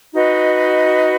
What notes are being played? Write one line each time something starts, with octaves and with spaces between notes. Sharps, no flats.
D#4 F#4 B4 D#5